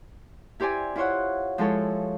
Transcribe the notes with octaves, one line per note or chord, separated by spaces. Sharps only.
E4 G4 C5 D5 G#5
E4 F4 C5 C#5 F#5
F3 G#3 E4 A4 C#5